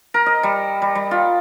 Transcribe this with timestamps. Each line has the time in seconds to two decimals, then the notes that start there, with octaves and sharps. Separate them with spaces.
0.14 A#4
0.26 D#5
0.43 G3
0.82 G3
0.95 G3
1.11 F4